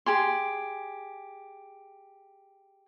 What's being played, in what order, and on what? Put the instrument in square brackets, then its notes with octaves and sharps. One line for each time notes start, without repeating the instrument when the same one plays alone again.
[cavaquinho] G4 G#4 C6